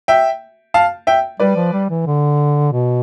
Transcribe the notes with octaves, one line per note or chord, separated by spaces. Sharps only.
E5 G5
F5 A5
E5 G5
G3 B4 D5
F3
G3
E3
D3
B2